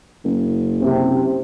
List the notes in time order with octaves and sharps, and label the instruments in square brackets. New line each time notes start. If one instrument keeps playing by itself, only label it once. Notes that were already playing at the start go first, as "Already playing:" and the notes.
[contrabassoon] F#1
[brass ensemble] C3